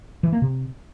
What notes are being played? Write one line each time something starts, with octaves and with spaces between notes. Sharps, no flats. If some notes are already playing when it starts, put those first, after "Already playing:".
E3
A#3
C3